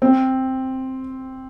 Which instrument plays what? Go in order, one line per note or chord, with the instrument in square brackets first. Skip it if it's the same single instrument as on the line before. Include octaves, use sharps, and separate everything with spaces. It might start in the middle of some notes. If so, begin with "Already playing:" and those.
[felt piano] C4